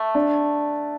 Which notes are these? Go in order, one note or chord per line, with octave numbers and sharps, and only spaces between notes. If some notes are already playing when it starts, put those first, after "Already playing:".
Already playing: A3
D4